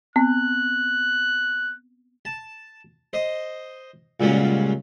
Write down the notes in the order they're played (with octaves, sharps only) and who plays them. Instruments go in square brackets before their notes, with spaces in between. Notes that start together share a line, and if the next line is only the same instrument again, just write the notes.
[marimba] B3 C4 [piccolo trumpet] F#6
[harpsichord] A5
C5 D#5
C#2 A#2 F#3 G3 A#3 C#4